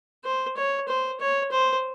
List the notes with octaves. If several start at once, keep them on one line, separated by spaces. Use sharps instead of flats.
C5
C#5
C5
C#5
C5